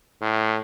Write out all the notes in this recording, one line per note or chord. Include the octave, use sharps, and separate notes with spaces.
A2